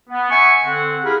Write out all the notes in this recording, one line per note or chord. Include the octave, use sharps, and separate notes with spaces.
B3
E5 F#5 G#5 C#6
D3 C4 F#5
E4 G4 G#4 A#4 F5 B5